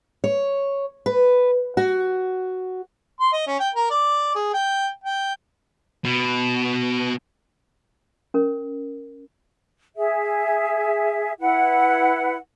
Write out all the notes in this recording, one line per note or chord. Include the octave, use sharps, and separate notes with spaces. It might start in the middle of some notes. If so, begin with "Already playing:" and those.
C#5
B4
F#4
C6
D#5
C#4
G5
A#4
D5
G#4
G5
G5
B2
C#4 A#4
G#4 E5
E4 B4 F#5